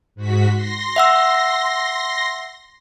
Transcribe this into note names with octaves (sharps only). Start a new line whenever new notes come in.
G#2 F#4 B6
C6 A#6
E5 F#5 E6